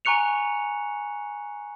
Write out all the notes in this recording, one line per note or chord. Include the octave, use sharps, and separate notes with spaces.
G#5 A#5 C#6 F#6 C#7 F7